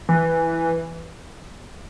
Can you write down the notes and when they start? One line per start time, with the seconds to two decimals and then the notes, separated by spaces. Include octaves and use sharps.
0.09 E3